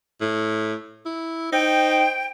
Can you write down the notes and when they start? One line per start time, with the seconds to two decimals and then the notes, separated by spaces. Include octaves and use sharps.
0.21 A2
1.06 E4
1.52 D#4 C5 G5